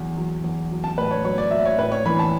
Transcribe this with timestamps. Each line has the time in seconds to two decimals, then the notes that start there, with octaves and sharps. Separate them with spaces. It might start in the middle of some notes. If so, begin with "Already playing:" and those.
Already playing: E2 F#3
0.17 F#3
0.44 E2
0.71 F#3
0.84 A5
0.98 A2 B4
1.11 C#5
1.24 F#3 C#5
1.38 D5
1.51 F#3 E5
1.65 C#5
1.78 A2 B4
1.92 C#5
2.06 E3 B5
2.19 A5